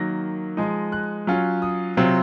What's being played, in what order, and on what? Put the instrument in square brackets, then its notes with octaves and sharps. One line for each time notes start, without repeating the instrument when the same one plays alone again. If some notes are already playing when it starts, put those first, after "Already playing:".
Already playing: [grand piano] D#3 F#3 A#3 A#6
F3 G#3 D#4
F#6
F#3 C#4 F4
D#6
C3 F#3 C4 F4